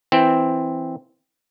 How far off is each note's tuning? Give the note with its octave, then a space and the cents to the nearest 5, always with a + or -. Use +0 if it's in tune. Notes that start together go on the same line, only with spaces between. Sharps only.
E3 +0 C4 +0